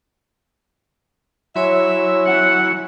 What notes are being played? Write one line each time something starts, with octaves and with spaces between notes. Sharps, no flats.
F#3 E4 C#5 E5 G#5 C6
F#5